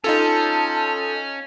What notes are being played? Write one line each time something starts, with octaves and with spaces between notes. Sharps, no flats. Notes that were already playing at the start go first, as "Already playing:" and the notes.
C#4 D#4 F4 A4 A5